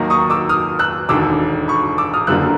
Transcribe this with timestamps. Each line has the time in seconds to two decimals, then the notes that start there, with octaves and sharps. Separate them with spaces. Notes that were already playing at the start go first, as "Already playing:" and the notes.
Already playing: D#2 D#3 F#3 A#3
0.10 C#6 D#6
0.30 D6 E6
0.49 D#6 F6
0.79 E6 F#6
1.09 E1 D#2 D3 D6 E6
1.68 B5 C#6
1.98 D6 E6
2.14 D#6 F6
2.27 F#1 F#2 D3 G3 A#3 E6 F#6